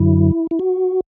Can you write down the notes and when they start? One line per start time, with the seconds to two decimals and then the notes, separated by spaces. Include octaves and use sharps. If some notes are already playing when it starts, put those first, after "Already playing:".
Already playing: F#2 D3 F#3 E4
0.51 E4
0.59 F#4